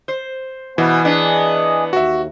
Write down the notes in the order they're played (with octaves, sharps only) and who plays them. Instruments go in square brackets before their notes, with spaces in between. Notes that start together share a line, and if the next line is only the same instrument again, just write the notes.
[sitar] C5
[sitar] B2 [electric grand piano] E3 [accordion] B3 G#5
[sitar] B3 D4 [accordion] G#4 D#5
[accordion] D#2 [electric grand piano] F#4 E5